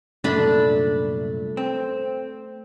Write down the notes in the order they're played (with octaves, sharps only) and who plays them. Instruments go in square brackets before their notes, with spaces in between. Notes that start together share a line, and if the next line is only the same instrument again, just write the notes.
[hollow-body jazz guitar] C2 F#2 A#2 [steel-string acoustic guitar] A3 [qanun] D4 B5
[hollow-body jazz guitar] C4